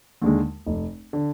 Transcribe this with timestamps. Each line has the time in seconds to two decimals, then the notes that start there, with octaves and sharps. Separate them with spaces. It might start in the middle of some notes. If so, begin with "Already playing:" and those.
0.22 D#2 D3 G#3
0.67 F1
1.13 D3